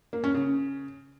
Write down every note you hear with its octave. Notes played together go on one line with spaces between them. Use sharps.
A#3
C#4
C#3